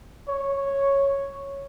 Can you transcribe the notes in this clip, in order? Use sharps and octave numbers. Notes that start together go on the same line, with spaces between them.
C#5